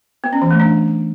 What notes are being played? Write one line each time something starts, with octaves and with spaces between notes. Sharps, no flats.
B3
C#4
E3
A3
D4